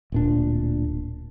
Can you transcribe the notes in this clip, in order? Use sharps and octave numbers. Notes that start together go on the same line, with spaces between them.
D1 A#2 D4